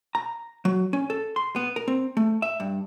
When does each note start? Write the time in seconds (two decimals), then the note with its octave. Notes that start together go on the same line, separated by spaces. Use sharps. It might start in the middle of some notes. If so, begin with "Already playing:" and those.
0.15 A#5
0.65 F#3
0.93 C#4
1.10 A4
1.36 C6
1.56 B3
1.76 A#4
1.88 C4
2.17 A3
2.42 E5
2.60 G2